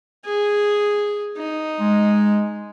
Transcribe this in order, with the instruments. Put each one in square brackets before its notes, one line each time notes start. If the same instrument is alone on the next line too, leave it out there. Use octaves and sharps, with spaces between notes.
[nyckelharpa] G#4
D#4
[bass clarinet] G#3